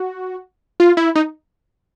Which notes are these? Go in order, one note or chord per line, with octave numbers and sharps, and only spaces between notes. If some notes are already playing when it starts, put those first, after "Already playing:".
Already playing: F#4
F4
E4
D#4